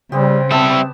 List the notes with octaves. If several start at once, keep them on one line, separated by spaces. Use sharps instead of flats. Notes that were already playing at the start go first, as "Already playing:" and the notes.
C#3 G3 B3 C4 G4
G3 B3 C4 E5 A5